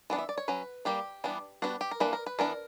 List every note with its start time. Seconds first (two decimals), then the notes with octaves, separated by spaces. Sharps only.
0.10 E3 B3 D4
0.18 E5
0.29 D5
0.38 C#5
0.48 F#3 C#4 B4
0.85 G3 A#3 D4 G4
1.24 E3 G3 B3 D4
1.62 G3 B3 D4 F#4
1.81 G4
1.91 A#4
2.00 E3 A#3 D4 B4
2.13 A#4
2.26 B4
2.39 E3 B3 D4 A#4